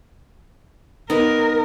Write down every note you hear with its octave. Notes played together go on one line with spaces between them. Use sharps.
B3 D#4 A#4